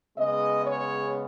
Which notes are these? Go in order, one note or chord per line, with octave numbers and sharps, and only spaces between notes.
C#3 G#3 B3 D#5
C#5